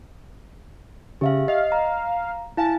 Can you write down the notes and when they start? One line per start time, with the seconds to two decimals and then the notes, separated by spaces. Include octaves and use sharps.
1.21 C#3 G4 E5 F5
1.48 D#5 F5
1.72 A#5
2.57 E4 F5 G#5 A5